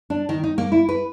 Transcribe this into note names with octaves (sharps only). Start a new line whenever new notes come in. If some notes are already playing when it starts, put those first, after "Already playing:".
D4
D#3
D#4
A#3
E4
B4